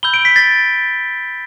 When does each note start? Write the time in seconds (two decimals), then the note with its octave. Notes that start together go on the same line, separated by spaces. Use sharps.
0.03 B5 E6 G6 G7
0.14 D7
0.25 B6
0.36 A6